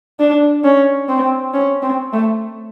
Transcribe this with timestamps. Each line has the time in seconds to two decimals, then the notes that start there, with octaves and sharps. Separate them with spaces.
0.20 D4
0.64 C#4
1.09 C4
1.54 C#4
1.83 C4
2.13 A3